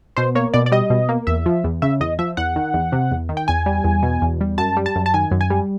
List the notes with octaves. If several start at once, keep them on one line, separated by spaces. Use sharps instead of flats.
B2 C5
A#3 C#5
B2 D5
D5
G3 D#5
B2
A#3
E2 E5
F3
E2
C#3 E5
E2 D#5
F3 E5
E2 F#5
D#3
E2
C3
E2
D#3
G5
E2 G#5
G3
E2
B2
E2
G3
F#2 A5
G3
A5
F#2
A5
D#3 G#5
F#2
G#5
G3